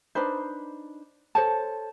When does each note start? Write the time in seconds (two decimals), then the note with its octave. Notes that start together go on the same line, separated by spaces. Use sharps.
0.15 D4 D#4 B4 C5
1.35 A4 C5 C#5 A5